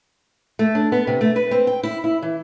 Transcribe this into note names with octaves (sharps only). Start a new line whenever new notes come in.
A3
D4
B3
C3
A3
B4
C4
G5
E4
E4
E3